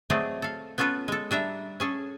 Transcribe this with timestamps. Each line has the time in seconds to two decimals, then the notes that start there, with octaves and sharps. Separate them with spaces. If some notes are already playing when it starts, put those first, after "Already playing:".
0.10 F#3 A3 C4 G#4 D5 D#5
0.42 A4 F5
0.78 B3 C#4 F4 A4 B4
1.08 G#3 A4
1.31 G3 D4 E5 A#5
1.80 C#4 G#4 A4